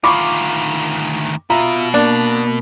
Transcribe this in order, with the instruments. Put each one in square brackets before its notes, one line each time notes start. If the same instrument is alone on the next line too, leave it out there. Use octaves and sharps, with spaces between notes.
[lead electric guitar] D2 D#3 [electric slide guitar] F4 [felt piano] B5 C#6 D6
[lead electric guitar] B2 [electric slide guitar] F4 E5 [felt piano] A#5
[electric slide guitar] A#3 [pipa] D4